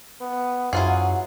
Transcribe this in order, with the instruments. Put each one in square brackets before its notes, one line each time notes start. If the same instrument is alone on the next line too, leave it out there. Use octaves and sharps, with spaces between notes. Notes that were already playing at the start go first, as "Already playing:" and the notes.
[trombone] B3
[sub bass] F#2 [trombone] F#3 [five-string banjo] E4 F4 G#4 [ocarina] F#5